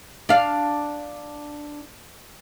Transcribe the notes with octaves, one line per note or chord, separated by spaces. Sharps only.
D4 F5